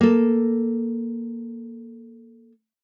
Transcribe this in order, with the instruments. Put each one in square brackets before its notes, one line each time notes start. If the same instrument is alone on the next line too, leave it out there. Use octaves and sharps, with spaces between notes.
[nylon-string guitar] A#3 A4